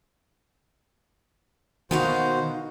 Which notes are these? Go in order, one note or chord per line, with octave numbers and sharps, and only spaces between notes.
B2 D#3 D#4 F#4 C5 F5